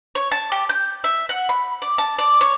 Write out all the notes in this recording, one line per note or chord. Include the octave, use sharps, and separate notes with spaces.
C#5
A5
G4
G6
E5
F#5
B5
D5
A5
D5
C#5